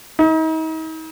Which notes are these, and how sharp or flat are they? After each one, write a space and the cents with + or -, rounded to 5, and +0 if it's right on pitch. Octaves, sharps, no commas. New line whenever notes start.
D#4 +40